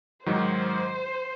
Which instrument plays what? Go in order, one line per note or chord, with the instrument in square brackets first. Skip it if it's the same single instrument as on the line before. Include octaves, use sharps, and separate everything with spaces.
[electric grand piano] G#2 D#3 F#3 [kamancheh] C5